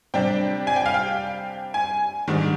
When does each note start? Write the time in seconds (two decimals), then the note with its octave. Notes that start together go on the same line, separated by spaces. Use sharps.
0.14 C3 G3 D4 G5
0.67 G#5
0.76 G5
0.86 F5
0.94 G5
1.74 G#5
2.28 G#2 D#3 G3 D4